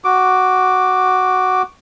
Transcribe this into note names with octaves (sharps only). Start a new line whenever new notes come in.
F#4 D6